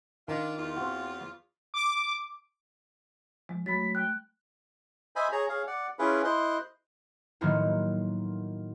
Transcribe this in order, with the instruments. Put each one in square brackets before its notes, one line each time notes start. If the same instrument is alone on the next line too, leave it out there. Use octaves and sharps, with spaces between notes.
[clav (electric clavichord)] D#3 [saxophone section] D4 F4
[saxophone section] E2 F4
[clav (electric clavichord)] C4 F#4
[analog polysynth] D6
[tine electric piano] F3 [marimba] G#3
[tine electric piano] F#3 [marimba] A3 B5 A6 [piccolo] B6
[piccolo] G5 [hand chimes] F#6
[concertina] C5 D#5 E5 G#5 B5
G#4 C#5 A#5
G#4 C#5 F5
D5 F#5
C#4 E4 F4 G#4 B4
E4 C5 D#5 C6 F#6
[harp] A2 D#3 F#3 A#3 B3 F4